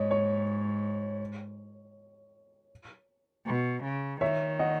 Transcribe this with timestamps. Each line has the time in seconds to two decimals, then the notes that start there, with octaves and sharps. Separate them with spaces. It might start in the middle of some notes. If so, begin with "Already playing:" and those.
Already playing: G#2 C#5 D#5
0.11 C#5
3.46 B2
3.84 C#3
4.21 D#3 C#5 E5
4.59 D#5 F#5